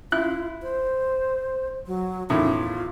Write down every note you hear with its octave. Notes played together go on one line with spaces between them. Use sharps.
E4 F4 F#6
C5
F#3
E2 A2 D#3 F4